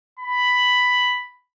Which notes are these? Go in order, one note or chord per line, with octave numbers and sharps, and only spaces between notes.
B5